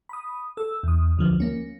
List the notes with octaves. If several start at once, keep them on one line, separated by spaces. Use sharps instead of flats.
B5 D#6
A4 E6
E2 D#6
D2 D3 F3
A#3 C#4